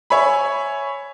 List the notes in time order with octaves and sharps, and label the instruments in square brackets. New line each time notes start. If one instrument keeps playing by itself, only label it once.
[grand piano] C#5 E5 G#5 B5